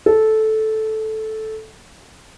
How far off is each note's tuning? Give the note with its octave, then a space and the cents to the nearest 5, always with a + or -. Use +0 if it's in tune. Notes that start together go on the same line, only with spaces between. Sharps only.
A4 -10